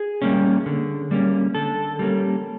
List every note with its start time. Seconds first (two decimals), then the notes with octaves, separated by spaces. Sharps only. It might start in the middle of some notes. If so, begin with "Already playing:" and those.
Already playing: G#4
0.22 G3 A#3 C#4
0.66 D3
1.11 G3 A#3 C#4
1.55 D3 A4
1.99 G3 A#3 C#4